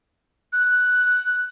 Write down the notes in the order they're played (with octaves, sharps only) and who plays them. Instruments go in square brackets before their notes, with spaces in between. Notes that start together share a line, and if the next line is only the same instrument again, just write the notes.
[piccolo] F#6